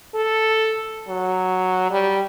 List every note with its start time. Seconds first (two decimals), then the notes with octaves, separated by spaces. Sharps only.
0.15 A4
1.08 F#3
1.90 G3